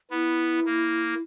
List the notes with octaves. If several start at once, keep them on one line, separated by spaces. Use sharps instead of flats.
B3 E4
A#3